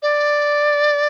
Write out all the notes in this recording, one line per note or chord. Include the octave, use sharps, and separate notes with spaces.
D5